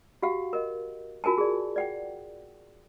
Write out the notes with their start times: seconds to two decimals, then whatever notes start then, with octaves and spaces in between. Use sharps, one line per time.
0.22 F#4 G4 F5 F#5
0.53 A#4 D#5
1.24 F4 F#4 A#4 G#5 A5
1.38 G#4 D5
1.76 D5 F#5 G5